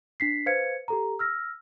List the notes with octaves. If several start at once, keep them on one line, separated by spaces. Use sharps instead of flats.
D4 B6 C7
B4 C5 F5 G#6 C#7
G4 A4 A#5
E6 F6 A#6